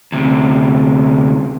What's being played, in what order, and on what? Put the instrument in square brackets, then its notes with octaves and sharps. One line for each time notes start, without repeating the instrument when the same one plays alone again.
[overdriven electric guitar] D2 C3